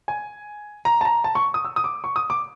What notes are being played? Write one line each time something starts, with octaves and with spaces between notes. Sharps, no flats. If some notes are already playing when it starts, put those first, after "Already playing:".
G#5
A#5
A5
A#5
A5
C#6
D#6
E6
D#6
D6
C#6
D#6
D6